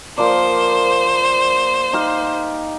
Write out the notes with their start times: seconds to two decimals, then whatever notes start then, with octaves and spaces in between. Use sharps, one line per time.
0.18 F3 A#3 C5 D5
1.93 D#4 G4 F5